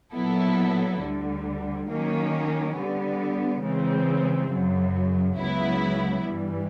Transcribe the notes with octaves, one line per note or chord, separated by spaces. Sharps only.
A#2 F#3 B3 E4 A4
D2 D3 G3
D#3 F#3 A#3 C#4
D3 G3 B3
C#3 E3 G#3 C4
F#2 C#3 F#3
C#2 C#3 F#3 B3 E4
G2 E3 G3